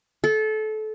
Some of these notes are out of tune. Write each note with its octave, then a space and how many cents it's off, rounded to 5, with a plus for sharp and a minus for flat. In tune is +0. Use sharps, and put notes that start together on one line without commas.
A4 -25